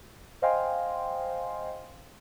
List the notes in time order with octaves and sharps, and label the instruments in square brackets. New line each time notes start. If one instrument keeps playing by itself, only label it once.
[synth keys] C5 D#5 F5 G5 G#5 C6